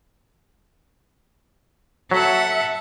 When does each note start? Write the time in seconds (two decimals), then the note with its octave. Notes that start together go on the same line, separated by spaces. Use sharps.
2.11 F#3 A4 E5 F#5